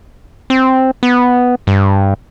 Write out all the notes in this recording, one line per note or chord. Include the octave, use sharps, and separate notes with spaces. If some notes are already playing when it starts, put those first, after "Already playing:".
C4
B3
G2